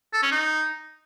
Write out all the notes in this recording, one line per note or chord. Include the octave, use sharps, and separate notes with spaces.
A4
C#4
D#4